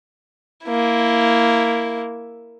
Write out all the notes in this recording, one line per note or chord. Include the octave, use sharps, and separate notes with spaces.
A#3 E4